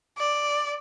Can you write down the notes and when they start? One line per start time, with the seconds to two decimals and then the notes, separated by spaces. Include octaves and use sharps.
0.18 D5